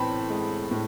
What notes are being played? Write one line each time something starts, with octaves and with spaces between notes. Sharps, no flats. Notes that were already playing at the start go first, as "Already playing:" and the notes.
Already playing: A2 E3 C4 A5 B5
G#3
A2